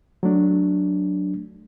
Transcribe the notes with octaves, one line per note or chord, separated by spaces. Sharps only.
F#3 A3 D4